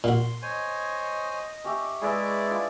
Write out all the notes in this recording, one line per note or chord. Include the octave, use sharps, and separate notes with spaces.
A#2 F#4 C6
C5 C#5 D#5 G#5
C#4 G4 E5
G#3 E4 G#4 B4 D5 E5
D4 F4